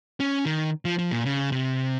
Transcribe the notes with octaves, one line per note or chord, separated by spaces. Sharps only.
C#4
D#3
F3
F3
A#2
C#3
C3